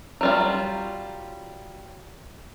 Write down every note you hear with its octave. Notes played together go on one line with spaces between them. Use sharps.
F#3 G3 F4